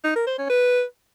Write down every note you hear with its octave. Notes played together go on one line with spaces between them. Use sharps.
D#4
A#4
C5
C#4
B4